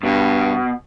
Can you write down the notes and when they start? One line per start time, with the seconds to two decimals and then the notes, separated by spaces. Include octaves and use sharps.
0.03 G2 B2